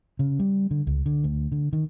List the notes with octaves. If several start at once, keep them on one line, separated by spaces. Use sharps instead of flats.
C#3
G3
D3
C#2
D3
D2
D3
D#3